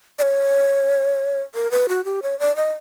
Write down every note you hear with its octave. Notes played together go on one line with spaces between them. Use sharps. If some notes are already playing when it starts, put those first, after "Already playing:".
D5
C#5
A#4
B4
F#4
G4
C#5
D5
D#5